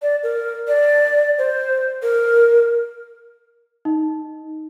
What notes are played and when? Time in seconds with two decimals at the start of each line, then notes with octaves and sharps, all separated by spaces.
0.02 D5
0.23 A#4
0.68 D5
1.39 C5
2.02 A#4
3.85 D#4